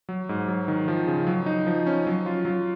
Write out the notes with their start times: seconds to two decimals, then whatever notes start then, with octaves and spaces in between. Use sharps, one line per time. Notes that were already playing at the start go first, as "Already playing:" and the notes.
0.09 F#3
0.29 G#2
0.48 F#3
0.68 D#3
0.88 F3
1.07 C#3
1.27 F#3
1.46 D#4
1.67 F3
1.86 C#4
2.07 F#3
2.26 F4
2.45 F#3